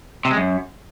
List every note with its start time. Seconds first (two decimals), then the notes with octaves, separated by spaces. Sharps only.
0.25 C3
0.31 G#3
0.37 F#2